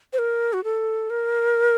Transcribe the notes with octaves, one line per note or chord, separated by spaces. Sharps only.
C5
A#4
F#4
A4
A#4